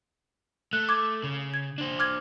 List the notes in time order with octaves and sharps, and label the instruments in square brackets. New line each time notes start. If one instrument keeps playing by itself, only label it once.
[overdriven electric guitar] A3 [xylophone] F#6
[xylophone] D6 G#6
[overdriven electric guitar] C#3
[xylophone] G#6
[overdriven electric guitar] D4 C5
[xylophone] D6 F6 G#6